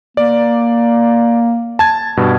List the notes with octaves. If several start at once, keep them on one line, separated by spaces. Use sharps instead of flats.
A#3 D5
A5 G#6
G2 B2